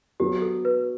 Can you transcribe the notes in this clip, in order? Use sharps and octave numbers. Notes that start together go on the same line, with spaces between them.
F#3 B3 D4 G4
A4
B4